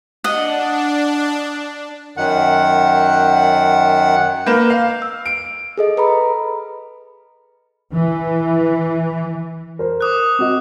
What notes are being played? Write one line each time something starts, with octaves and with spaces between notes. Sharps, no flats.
D4 D#5 F#5
F#2 D#3 F#5
A#3 B4 G6 E7
F5
E6
D7
G#4 A4 D#5
B4 A#5 B5
E3
A#4 C5
D6 D#6 F#6
C4 F#4 D#5